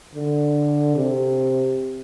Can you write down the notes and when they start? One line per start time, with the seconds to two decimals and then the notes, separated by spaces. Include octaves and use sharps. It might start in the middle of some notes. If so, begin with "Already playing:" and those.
0.15 D3
0.96 C3